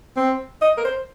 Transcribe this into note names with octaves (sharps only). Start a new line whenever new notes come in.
C4
D#5
A#4
C5